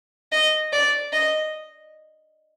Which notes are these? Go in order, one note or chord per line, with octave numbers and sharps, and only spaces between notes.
D#5
D5
D#5